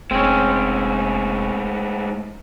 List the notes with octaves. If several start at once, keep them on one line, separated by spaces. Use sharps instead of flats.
F1 A2 G#3 C4 C#4